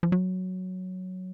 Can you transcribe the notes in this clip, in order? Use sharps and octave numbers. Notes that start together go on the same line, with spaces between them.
F3
F#3